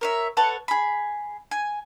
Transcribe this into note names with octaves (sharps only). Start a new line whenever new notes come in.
A#4 C#5 E5
A4 B4 C#5 F#5
G#4 B5
G#5